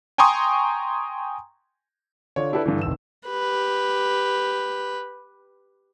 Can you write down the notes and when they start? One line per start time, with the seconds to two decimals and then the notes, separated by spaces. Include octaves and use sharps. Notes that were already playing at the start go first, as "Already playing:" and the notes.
0.18 G5 G#5 A#5 C6 C#6 D#6
2.36 D3 F4 C#5 D5
2.52 D4 E4 G4 A4 B4 D5
2.66 G2 D3 E3
2.82 F1 D#3 E6 E7
3.27 G4 B4